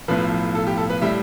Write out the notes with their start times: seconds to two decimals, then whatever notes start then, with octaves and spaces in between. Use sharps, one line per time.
0.08 B1 A2 F3 B4
0.55 A4
0.67 G4
0.77 A4
0.90 B4
1.01 A2 G3 E5